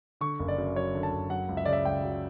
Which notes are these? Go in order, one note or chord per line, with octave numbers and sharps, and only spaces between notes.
D3 C#6
F#1
D5
F#2
F#3 C#5
D3
A5
F#1
F#3 F#5
C#2
E5
C#3 D5
E5
C#2 G5
F#3